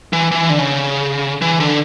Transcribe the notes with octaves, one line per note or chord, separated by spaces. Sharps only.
E3
E3
D3
C#3
E3
D3